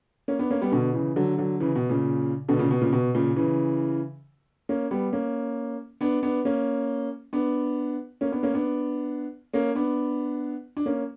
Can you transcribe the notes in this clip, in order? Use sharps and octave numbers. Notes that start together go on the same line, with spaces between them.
A#3 C#4
B3 D4
A#3 C#4
G3 B3
B2 D3
C#3 E3
D3 F#3
D3 F#3
C#3 E3
B2
A#2 C#3
B2 D3
A#2 C#3
B2
A#2 C#3
B2
A#2 C#3
C#3 E3
A#3 C#4
G3 B3
A#3 C#4
B3 D4
B3 D4
A#3 C#4
B3 D4
A#3 C#4
B3 D4
A#3 C#4
B3 D4
A#3 C#4
B3 D4
D4
A#3 C#4